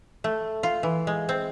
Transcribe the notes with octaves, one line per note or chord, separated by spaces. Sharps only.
A3
F4
E3
G#3
C4